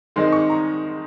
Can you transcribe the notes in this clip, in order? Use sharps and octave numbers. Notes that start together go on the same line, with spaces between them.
D#3 G#3 C4 D#4 C6
C#6
A#5